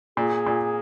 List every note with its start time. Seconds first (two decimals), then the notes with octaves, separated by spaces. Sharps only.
0.17 A#2 G#4
0.47 A#2